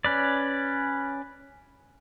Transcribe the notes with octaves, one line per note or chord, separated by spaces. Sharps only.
C#4 B4 D5